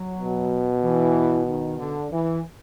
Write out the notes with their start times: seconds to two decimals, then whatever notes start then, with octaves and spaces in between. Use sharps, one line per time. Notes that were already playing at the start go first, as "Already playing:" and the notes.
Already playing: F#3
0.19 B2
0.84 E3
1.47 D#3
1.79 D3
2.12 E3